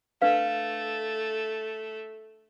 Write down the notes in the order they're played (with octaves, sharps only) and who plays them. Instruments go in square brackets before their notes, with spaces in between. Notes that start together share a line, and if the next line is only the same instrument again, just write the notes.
[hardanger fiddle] A3 [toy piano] D4 B4 F5